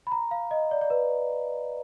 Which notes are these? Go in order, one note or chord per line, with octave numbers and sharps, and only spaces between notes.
B5
A#5
F5
D#5
D5
D5
B4